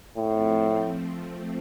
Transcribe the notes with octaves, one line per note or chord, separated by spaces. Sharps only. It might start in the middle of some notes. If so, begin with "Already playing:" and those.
A2 F3 A3 C4